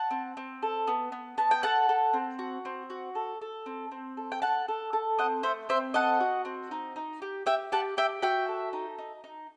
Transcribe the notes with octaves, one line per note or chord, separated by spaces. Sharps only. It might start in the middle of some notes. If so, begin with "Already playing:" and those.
Already playing: F#5 A5
C4
C4
A4
B3
B3
B3 A5
G5
A4 F#5 A5
A4
C4
F#4
C4
F#4
A4
A4
C4
C4
A4
G5
A4 F#5 A5
A4
A4
C4 D#5 F#5
A3 C5 E5
C4 C5 E5
A4 D#5 F#5
F#4
C4
D#4
D#4
G4
G4 E5 G5
G4 F#5 A5
G4 E5 G5
F#4 E5 G5
A4
D#4
D#4
D#4